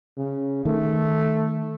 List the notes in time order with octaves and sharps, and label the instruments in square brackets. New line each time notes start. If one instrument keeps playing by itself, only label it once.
[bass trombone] C#3
[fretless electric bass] D#3 [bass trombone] A3